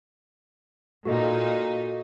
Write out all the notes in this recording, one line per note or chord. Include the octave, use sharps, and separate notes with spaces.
A#2 D#4 F#4 A4 D#5